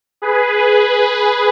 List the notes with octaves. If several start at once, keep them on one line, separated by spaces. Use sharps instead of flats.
G#4 B4